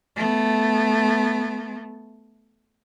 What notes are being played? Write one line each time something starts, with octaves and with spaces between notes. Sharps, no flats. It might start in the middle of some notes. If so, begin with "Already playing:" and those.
A3 B3